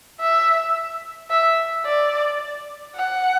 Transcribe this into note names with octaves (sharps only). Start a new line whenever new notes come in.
E5
E5
D5
F#5